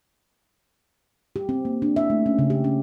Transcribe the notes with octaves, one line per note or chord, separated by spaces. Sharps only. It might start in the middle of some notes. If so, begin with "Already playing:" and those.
G4
C4
A#3
D4
E5
A3
C#4
C#3
G4
C#4